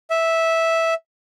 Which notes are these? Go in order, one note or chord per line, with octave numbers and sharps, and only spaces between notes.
E5